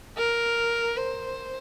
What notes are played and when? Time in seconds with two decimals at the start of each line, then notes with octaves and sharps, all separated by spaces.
0.17 A#4
0.97 C5